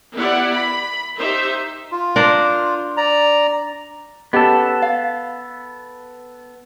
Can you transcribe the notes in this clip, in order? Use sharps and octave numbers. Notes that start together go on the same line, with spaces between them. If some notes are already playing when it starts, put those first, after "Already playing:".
B3 E4 G4 D5 F#5
B5
D#4 G4 C5 E5
F4
D4 A#4 C5
D5 A#5
B3 C#4 G4 A4 D#5
F5